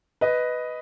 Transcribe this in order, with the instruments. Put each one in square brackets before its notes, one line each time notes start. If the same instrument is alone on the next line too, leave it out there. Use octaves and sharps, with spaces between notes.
[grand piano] B4 D#5